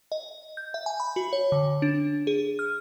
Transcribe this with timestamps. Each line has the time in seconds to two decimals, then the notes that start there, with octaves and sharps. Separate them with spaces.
0.12 D#5
0.57 G6
0.74 E5
0.86 G#5
1.00 B5
1.16 F#4
1.33 C#5
1.52 D3
1.82 D4
2.27 G#4
2.59 F6